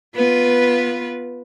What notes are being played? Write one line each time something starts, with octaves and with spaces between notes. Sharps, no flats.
B3 F4 B4